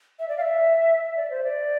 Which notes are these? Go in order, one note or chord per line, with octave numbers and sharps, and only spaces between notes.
E5
D5
F5
E5
E5
D5
C5
D5